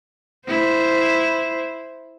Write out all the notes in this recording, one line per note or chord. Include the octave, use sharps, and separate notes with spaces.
E4 C5